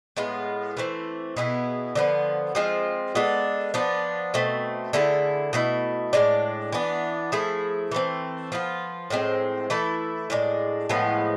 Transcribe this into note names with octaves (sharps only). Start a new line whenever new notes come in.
A2 G#3 B3 F4
E3 A3 C4
B2 B3 E4 G#4
D3 F3 B3
F3 G#3 C4 F4
G#3 B3 D4 A4
F3 B3 D4
B2 A3 C4
D3 A3 E4 G#4
B2 A3 E4
A2 G#3 D4
E3 B3 D4
F3 A3 E4 G#4
E3 A3 C4
F3 B3 F4
A2 F3 G#3 C4
E3 A3 E4 A4
A2 G#3 D4
A2 F3 G#3 B3